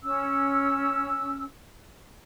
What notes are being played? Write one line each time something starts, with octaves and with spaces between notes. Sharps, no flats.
C#4 E6